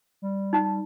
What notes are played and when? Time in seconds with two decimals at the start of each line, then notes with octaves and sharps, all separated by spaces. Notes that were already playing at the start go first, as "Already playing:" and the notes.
0.22 G3
0.53 D#4 A5